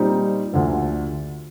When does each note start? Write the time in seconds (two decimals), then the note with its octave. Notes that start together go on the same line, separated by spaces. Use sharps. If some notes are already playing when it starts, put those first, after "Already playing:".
Already playing: A#2 G3 C4 D#4
0.53 D2 D3 F3